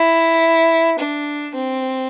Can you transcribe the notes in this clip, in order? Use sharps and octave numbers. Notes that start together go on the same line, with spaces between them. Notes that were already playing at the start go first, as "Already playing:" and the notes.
Already playing: E4
D4
C4